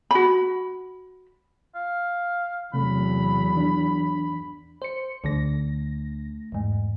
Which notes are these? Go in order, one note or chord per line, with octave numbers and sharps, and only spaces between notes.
F#4 B5
F5
E2 C3 F#3 A3 B5
E3 D4
C5 C#7
D2 D3 A3 A#6
E2 G#2